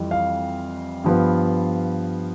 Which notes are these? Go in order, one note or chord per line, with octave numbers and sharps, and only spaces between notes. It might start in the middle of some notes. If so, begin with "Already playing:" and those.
Already playing: F2 E3 G3
F5
G2 F3 B3